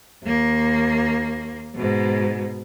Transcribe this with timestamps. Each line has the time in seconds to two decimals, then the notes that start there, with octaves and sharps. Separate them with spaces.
0.23 D#2 A#3
1.75 G#2 B2